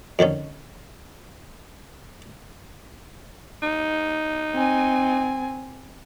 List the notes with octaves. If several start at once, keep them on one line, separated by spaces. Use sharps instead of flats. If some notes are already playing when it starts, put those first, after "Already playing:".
F2 D3 D#3 C#4
D#4
C4 G#5